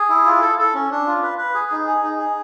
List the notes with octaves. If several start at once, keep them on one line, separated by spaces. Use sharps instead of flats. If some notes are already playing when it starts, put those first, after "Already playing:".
Already playing: G#4
E4
F4
A4
A4
C#4
D4
F4
B4
B4
G#4
D#4
G#4
D#4
G#4